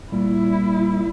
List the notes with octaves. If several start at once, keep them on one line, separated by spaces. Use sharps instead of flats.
A#2 G3 E4